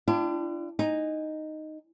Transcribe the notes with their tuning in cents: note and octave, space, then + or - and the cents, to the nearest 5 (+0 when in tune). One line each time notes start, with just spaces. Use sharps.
D4 +10 F4 -45 G5 +0
D#4 -5 G#5 -25